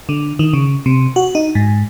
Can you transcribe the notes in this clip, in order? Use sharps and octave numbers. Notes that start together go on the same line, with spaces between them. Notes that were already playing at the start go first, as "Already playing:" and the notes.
D3
D#3
C#3
C3
F#4
D#4
G#2